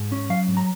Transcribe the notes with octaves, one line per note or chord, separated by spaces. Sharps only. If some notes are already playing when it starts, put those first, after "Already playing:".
Already playing: G#2
C#4
F#3 F5
G#2
A#5